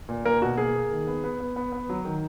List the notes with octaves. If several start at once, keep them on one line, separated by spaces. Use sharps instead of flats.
A#2
A#3 A#4
B2 F#4
A#3 G#4
A#3
D#3
B3
B3
B3
B3
B3
F#3
D#3